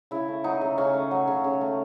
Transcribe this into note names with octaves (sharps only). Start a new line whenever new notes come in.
C#3 E4
A3
F#3 D#4
C#3
C#3 C#4
A3
F#3
C#3
C#3
A3